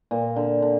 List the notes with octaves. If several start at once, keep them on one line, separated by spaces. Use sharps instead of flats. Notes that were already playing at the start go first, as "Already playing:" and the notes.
A#2
D3
D3